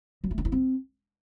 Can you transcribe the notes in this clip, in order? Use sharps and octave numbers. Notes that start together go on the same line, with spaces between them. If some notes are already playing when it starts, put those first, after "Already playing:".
F#3
A3
D4
E4
C4